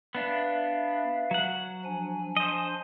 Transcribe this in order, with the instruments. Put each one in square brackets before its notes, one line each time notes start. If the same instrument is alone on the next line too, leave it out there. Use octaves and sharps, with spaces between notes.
[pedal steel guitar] B3 D4 [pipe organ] B4 E5 F5
[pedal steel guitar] F#3 F#5
[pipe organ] F3 D4 G#5
[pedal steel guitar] C5 D#5